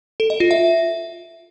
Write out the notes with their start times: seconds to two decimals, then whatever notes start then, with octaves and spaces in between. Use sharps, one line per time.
0.20 A4
0.30 D#5
0.40 F4
0.51 E5